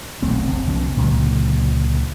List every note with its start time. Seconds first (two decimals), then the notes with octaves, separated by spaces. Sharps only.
0.22 D#1 B1 A3 C4
0.45 F1 C4
0.67 C2 F3 B3 C#4
0.96 C#2 A#2 D3 F#3